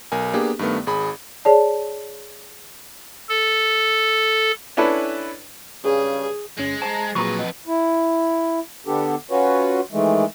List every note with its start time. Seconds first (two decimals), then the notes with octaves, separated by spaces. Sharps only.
0.12 B1 A#4 G#5
0.33 A#3 B3 D4 G4 G#4
0.59 G2 D#3 A3 B3
0.87 G#1 G#4 B5
1.45 G#4 C#5 D5 A5
3.29 A4
4.77 C#4 D4 E4 A4 B4
5.85 G2 C#3 G#4
6.59 G1 G#3 C#4
6.82 C5 A5 A#5 A6
7.15 F2 A#2 F#3 G#4 B4 A#5 C#6
7.39 F3 D#5 F#5
7.67 E4
8.87 D3 B3 D4 G4 A4
9.31 C#4 F4 F#4 B4 C#5
9.92 D#3 E3 G#3 A3